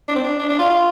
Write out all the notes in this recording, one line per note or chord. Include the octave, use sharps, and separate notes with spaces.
D4
C4
D4
D4
D4
F4
F4